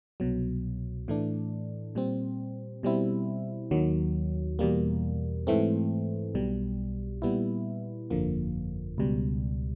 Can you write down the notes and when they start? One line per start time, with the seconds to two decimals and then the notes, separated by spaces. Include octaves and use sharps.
0.20 C2 B2 F#3
1.08 A2 E3 A3 D4
1.95 A#2 G3 C4
2.83 B2 G3 C4 E4
3.71 D#2 D#3 F#3
4.59 E2 B2 G3 A#3
5.47 G#2 E3 A3 C4
6.35 B1 B2 G3
7.22 A#2 G3 B3 E4
8.10 G1 F2 D3 F3 A#3
8.98 C#2 B2 G3